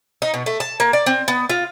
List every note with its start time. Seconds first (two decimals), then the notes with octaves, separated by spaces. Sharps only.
0.22 D#4
0.34 B2
0.46 A3
0.60 A5
0.80 A#3
0.93 D5
1.06 C4
1.28 B3
1.50 F4